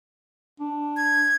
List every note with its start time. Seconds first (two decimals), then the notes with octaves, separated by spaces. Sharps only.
0.60 D4
0.97 G#6